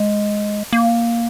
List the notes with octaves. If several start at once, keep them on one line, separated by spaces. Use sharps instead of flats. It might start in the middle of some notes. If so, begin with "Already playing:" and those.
Already playing: G#3
A#3